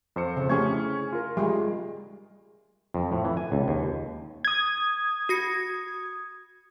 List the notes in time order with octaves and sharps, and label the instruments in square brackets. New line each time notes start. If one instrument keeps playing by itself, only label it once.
[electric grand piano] F2 C5 C#7
[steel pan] C#3
[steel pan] A3 G4 G#4 [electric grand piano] C#4 C#6 G#6
[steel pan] E4
[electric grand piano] F4 A#4
[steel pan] G3 G#3
[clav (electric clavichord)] F2
A2
E3
G#5
C#2
D#2
[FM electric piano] D#6 G#6
[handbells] F#4 A#6 C#7